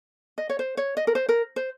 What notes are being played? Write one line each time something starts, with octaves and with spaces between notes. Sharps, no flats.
D#5
C#5
C5
C#5
D#5
A#4
C5
A#4
C5